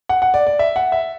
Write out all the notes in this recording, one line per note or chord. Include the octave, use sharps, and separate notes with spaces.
F#5
F#5
D5
D5
E5
F#5
E5